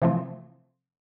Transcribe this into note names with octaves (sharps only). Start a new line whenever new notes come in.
C3 E3 F3 A3 C4